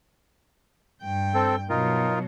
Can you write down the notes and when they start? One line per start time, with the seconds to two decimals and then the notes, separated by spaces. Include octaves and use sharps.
1.02 G2 G5
1.34 C4 A4
1.70 B2 F#3 D#4 F4 A#4